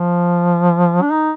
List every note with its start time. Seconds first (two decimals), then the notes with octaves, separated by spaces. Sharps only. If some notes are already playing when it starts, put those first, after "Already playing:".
Already playing: F3
1.02 D4
1.12 D#4